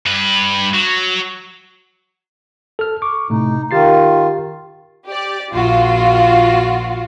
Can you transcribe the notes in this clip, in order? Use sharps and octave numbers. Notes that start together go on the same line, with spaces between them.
G2 B4
F#3
A4 F6
C#6 D6
A2 C3 A3 D#4
D#3 F4 G4 A6 C7
G4 D5
A#1 F4 F#4